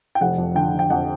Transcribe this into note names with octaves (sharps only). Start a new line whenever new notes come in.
G5
F1 F#5
F2
D3 G5
D3
G5
F2 F#5